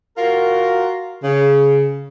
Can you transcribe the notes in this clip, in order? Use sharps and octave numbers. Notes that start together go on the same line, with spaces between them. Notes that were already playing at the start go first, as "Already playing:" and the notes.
F4 F#4 A#4
C#3